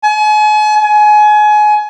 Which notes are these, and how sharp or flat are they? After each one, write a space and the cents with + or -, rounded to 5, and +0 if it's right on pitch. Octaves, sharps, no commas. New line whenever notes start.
G#5 +40
G#5 +25